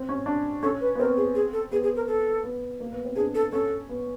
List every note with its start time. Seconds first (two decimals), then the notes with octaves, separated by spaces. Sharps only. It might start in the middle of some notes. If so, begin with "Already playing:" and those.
Already playing: C4
0.09 C#4
0.26 D4
0.63 C#4 A4
0.81 B4
0.95 B3
0.99 C4 A#4
1.17 G#4
1.35 G#4
1.53 A4
1.72 B3 G#4
1.83 G#4
1.96 A#4
2.08 A4
2.44 B3
2.80 A#3
2.93 B3
3.05 C4
3.16 D4 G#4
3.35 A4
3.52 C#4 A4
3.89 B3